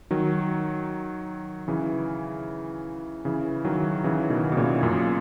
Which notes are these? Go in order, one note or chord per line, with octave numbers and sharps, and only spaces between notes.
D#3 F#3
C#3 E3
C#3 E3
D#3 F#3
C#3 E3
B2 D#3
B2
A#2 C#3
F#2 A#2